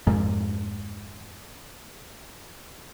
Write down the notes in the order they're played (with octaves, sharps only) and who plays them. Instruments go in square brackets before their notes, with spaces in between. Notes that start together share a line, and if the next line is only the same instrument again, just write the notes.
[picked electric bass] F2 G#2 G#3 A#3